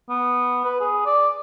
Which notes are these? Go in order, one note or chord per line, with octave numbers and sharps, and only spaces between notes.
B3
B4
G#4
D5